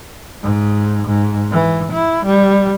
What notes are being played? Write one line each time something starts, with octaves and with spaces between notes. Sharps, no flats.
G#2
G#2
E3
E4
G3